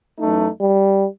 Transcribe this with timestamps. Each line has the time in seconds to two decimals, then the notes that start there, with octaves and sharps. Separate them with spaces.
0.17 F#2 E3 A3 D#4
0.61 G3